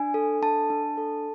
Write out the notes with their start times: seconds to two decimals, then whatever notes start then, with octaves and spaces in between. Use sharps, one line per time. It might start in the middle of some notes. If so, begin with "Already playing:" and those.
Already playing: D4 G#5
0.14 A4
0.42 D4 A5
0.70 D4
0.97 A4